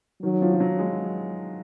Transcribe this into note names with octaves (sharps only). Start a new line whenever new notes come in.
D#3 F#3
F3
F3
F#3
G#3